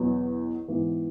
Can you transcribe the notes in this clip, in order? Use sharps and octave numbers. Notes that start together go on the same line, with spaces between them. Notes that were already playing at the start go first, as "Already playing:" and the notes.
Already playing: E2 B2 F#3 B3
G#2 E3 B3